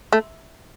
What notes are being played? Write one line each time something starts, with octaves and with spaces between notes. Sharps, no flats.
A3